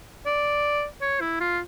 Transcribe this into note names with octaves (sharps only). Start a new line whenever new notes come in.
D5
C#5
E4
F4